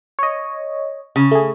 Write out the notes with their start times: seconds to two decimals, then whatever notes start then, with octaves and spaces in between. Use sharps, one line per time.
0.19 C#5 D#5
1.16 C#3
1.31 A3 G#4